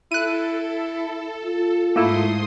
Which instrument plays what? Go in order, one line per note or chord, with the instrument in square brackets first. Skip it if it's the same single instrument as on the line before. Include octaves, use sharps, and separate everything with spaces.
[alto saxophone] E4 [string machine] A4 [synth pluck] F#6 D#7
[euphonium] F4
[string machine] G#2 C6 D#6 [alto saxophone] A3 [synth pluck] A#3 E4